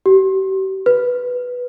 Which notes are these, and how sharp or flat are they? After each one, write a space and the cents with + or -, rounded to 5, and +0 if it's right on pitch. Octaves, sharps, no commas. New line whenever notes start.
G4 -40
B4 +0